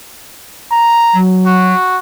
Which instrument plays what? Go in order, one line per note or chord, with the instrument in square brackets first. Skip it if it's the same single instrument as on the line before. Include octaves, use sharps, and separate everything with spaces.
[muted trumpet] A#5
[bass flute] F#3
[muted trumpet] F#4